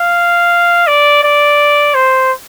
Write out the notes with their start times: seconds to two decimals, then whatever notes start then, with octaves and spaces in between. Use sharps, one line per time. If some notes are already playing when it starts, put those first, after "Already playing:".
Already playing: F5
0.87 D5
1.23 D5
1.95 C5